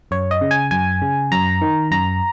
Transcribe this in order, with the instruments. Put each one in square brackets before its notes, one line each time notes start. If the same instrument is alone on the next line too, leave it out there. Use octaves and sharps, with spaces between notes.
[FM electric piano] F#2 C#5
D#5
C#3
G#5
F#2 G#5
C#3
F#2 A#5
D#3
F#2 A#5